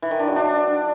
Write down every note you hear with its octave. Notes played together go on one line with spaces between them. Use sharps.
E3
D#3
D4
F#3
D4